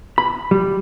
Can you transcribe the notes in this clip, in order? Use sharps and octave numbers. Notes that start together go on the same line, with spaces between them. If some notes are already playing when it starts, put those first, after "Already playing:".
B5
G3